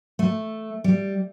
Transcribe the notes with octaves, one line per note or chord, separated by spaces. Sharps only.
A3
G3